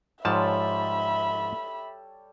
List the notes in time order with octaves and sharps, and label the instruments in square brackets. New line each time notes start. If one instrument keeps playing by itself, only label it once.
[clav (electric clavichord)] G#2 F3 A5 [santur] G3 A4 C#5 [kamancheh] E5 B5